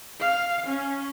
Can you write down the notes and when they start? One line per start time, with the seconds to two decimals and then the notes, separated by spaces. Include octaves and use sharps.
0.20 F5
0.67 C#4